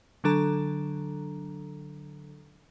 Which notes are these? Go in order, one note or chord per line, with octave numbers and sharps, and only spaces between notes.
D3 F#3 D4 A4 A#5